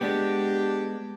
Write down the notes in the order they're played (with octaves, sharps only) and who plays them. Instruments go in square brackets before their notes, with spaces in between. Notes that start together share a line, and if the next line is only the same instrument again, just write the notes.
[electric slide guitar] G#3 B3 [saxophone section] D4 G4